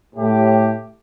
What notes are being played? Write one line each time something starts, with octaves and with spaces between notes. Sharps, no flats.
A2 G4